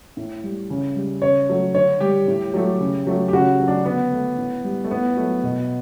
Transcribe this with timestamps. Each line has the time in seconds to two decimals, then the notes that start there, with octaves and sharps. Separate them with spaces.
0.17 A2
0.44 G3
0.70 C#3
0.96 G3
1.22 C#3 C#5
1.49 F#3 A3
1.74 D3 C#5
2.01 G3 G4
2.28 A2
2.54 F#3 A3
2.80 C#3
3.07 F#3 A3
3.28 G4
3.33 C#3 F#4
3.59 F#3 A3
3.68 D4
3.85 D3 B3
4.12 A3
4.38 A2
4.64 G3
4.84 A3
4.91 A2 B3
5.17 F#3 A3
5.43 B2